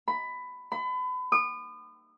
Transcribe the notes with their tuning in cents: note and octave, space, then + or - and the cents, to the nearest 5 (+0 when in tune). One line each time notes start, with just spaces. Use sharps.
B5 +15
B5 +35
D#6 -35